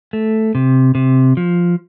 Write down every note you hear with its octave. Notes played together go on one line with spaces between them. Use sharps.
A3
C3
C3
F3